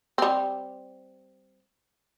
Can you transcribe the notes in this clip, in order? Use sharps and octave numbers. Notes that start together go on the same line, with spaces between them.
G3 C4